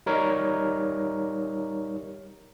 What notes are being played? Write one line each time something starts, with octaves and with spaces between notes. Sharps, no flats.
G3 D#4 A#4 C#5